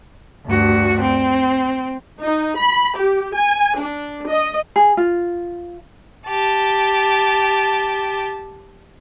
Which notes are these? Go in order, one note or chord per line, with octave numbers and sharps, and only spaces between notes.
D2 G2 F#4
C4
D#4
B5
G4
G#5
D4
D#5
G#4
F4
G4 A5